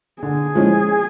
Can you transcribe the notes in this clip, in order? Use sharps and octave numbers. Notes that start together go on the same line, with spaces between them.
D3 G#4
F3 G#3 C#4 E4